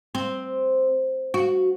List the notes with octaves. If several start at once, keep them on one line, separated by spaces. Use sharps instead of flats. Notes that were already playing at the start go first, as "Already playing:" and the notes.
C4
F#4